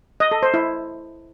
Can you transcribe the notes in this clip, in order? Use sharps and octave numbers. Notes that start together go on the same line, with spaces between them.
D#5
A4
C5
E4